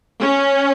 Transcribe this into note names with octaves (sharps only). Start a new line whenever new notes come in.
C#4